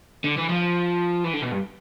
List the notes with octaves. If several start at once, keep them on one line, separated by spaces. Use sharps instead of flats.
D3
E3
F3
E3
D3
B2
G2